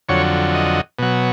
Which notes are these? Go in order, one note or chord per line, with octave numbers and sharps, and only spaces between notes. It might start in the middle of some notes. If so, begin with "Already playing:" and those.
F2 D3 F#3 C#5
D#5
B2 F#3